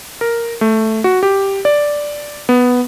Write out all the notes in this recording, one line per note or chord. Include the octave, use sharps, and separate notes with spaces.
A#4
A3
F#4
G4
D5
B3